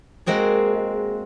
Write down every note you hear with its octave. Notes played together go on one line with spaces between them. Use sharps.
G#3 A#3 C4 F#4 G#4